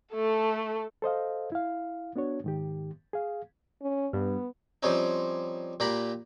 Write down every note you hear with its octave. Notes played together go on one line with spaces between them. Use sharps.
A3 A4
A4 C5 D#5 F5
E4 F5
B3 D4 F#4 C#5
G#2 D#3 G4
G#4 F5
C#4
G2 B3
F3 G3 C4 C#4 D#4
A#2 G4 A#4 B5